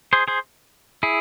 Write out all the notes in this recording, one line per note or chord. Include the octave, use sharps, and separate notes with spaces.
G#4 C5
G#4 C5
E4 G#4